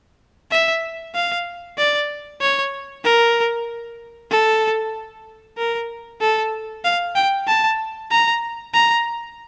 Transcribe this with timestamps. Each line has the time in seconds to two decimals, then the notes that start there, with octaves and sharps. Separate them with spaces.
0.51 E5
1.15 F5
1.77 D5
2.41 C#5
3.04 A#4
4.31 A4
5.58 A#4
6.21 A4
6.84 F5
7.15 G5
7.47 A5
8.11 A#5
8.74 A#5